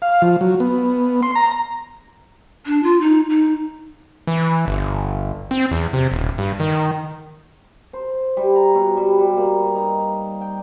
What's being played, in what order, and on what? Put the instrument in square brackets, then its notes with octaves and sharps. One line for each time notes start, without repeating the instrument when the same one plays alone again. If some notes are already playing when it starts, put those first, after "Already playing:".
[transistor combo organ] F5
F3
F#3
B3
C6
A#5
[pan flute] D4
F4
D#4
D#4
[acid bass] E3
G1
C4
E2
C3
D#1
G2
D#3
[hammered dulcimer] C5
G3
A#5
B2
G3
G3
A#3
D#4
G5